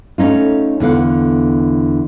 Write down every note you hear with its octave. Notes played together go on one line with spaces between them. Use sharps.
A3 C#4 D#4 F4
E2 D3 F5 F#5